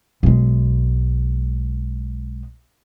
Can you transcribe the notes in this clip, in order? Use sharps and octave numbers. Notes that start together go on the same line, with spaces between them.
B1 G#3